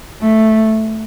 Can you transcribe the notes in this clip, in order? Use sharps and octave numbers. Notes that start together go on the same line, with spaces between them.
A3